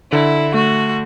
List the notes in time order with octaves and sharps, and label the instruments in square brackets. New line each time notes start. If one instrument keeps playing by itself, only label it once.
[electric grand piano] D3 [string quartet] E4
[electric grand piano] A3 [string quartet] F#4